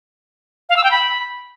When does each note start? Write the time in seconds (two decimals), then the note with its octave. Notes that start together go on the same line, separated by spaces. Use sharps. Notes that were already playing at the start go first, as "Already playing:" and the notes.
0.69 F5
0.77 E6
0.84 G5
0.91 B5